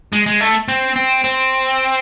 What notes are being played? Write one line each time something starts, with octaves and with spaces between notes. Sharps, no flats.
G#3
G#3
A3
C4
C4
C4